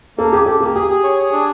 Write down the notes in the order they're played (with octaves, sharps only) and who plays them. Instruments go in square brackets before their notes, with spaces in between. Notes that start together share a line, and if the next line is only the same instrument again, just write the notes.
[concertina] A#3 [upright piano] A4
[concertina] G4 [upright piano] G#4
[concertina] G4 [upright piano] A4
[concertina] A#3 [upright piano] G#4
[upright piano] G4 [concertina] G#4
[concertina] G#4
C#5
G#4
D4